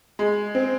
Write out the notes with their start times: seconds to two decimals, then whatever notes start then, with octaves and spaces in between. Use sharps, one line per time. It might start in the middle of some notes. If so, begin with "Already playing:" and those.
0.19 G#3
0.55 C4